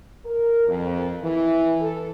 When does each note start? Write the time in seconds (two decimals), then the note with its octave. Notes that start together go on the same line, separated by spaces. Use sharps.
0.25 A#4
0.67 F2
1.22 E3
1.80 A4